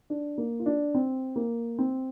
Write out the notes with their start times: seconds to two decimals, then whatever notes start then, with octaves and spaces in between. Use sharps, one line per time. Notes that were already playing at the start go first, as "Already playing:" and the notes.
0.10 D4
0.38 A#3
0.59 F4
0.66 D4
0.95 C4
1.36 A#3
1.79 C4